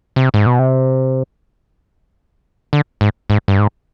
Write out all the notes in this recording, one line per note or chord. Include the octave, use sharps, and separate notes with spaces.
C3
G#2
B2
C3
D3
G#2
G#2
G2
G#2